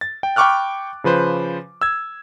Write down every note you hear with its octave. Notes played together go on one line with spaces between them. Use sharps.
A6
G5
G5 B5 C#6 D6 F6 F#6
C#3 F3 B4 C5
E6 G#6